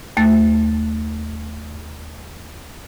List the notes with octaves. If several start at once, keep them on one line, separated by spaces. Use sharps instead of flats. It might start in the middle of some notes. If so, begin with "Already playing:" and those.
D#2 A3 A6